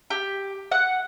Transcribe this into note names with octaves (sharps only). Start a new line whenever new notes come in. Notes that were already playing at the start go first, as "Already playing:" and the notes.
G4
F#5